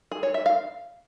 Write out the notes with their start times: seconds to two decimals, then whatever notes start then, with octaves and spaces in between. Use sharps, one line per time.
0.11 G#4
0.23 C#5
0.34 E5
0.46 F5